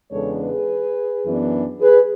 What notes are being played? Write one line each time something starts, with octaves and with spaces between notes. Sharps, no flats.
E2 C#3 G#3 B3 D4 A4 C#5
G#4 B4
F#2 E3 B3 D4
G#4 B4